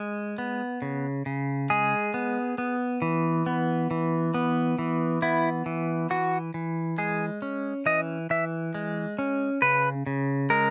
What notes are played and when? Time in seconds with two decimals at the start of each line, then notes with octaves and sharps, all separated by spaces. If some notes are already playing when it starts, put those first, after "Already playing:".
Already playing: G#3
0.38 B3
0.82 C#3
1.26 C#3
1.70 G#3 G#4
2.14 B3
2.58 B3
3.02 E3
3.46 B3
3.91 E3
4.34 B3
4.79 E3
5.22 B3 E4
5.66 E3
6.10 E3 F#4
6.54 E3
6.98 G#3 G#4
7.42 C#4
7.86 E3 D#5
8.30 E3 E5
8.75 G#3
9.19 C#4
9.62 C#3 B4
10.06 C#3
10.50 G#3 A#4